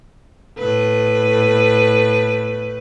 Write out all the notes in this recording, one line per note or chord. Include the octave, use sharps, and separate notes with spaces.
A2 B4